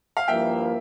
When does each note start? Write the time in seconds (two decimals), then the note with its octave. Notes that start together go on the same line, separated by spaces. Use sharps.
0.17 F5
0.28 G2 F3 A#3 E4 E5 G5